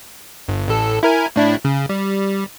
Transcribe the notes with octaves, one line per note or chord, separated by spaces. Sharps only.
G1
A1 A4
E4 A#4 G#5
A2 D4 E4
C#3
G3